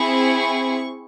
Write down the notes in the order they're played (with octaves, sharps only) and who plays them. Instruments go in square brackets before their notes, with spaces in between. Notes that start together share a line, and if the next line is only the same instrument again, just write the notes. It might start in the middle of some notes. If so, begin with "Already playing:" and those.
Already playing: [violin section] C4 E4 G#4 C#6